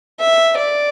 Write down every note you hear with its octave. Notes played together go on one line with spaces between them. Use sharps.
E5
D5